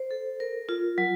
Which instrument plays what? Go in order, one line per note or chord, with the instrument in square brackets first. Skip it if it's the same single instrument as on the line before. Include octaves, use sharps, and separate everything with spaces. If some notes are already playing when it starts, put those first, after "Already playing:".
Already playing: [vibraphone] C5
A4
A#4
F4
F#3